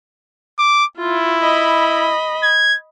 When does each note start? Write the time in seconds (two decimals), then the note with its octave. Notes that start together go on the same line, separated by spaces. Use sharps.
0.58 D6
0.97 E4 F4
1.42 D#5 B5
2.43 G#6